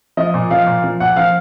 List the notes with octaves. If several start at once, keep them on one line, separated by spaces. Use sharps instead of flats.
F3 D#5
A#2
F3 F5
A#2
F3
A#2 F#5
F3 F5